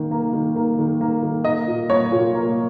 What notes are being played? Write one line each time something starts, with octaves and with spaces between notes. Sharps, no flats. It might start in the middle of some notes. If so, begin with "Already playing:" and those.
Already playing: D#3 A#3
A#3
D#3
A#3
D#3
A#3
D#3
A#3 D#5
A#2
A#3 C#5
A#2
A#3